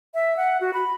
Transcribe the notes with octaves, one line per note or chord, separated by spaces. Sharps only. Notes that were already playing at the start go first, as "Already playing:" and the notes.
E5
F#5
F#4
B5